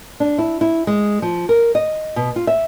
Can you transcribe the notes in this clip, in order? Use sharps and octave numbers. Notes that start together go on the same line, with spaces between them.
D4
E4
E4
G#3
F3
A#4
D#5
B2
F4
E5